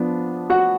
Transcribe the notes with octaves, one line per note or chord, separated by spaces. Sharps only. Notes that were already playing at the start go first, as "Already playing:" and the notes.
Already playing: F3 B3 D4
F#4 F#5